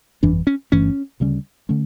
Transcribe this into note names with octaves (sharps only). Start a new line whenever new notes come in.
G1 F2 E3 D4
C#4
G1 G2 E3 A3 C#4
D2 C#3 G3 C#4
D3 A3 C#4